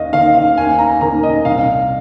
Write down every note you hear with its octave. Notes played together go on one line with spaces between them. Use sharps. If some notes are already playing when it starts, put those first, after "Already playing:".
Already playing: D#2 D#5 F5
D#3 A#3 F5
F5
D#2 G#5
A#5
D#3 A#3 A#5
D#5
C2 F5